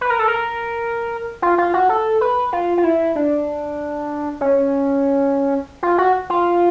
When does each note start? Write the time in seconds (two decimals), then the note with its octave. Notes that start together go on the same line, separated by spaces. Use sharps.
0.01 B4
0.10 A#4
0.19 A4
0.28 A#4
1.42 F4
1.58 F4
1.74 F#4
1.89 A4
2.21 B4
2.53 F4
2.78 F4
2.84 E4
3.15 D4
4.41 C#4
5.83 F4
5.98 F#4
6.30 F4